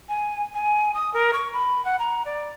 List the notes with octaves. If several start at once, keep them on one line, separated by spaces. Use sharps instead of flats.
G#5
G#5
D#6
A#4
C#6
B5
F#5
A#5
D5